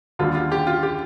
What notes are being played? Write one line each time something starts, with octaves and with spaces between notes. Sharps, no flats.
D#2 D3 G3 F4
F4
G4
F4
G4